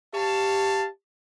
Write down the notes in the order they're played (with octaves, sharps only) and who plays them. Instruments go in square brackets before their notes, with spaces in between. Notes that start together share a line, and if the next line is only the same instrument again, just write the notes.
[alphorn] G4 [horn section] C#5 F5 A5